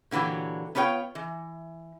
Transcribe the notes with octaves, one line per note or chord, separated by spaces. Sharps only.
A#2 D3 E3 F#3 G4
B3 D4 F4 C#5 G5
E3